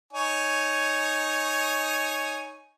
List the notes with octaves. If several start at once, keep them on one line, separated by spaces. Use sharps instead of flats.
D#4 C#5 G#5